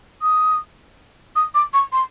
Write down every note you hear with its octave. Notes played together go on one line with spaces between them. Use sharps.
D#6
D#6
D6
C#6
C6